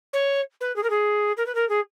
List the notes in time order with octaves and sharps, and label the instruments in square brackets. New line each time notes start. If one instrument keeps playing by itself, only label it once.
[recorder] C#5
B4
G#4
A#4
G#4
A#4
B4
A#4
G#4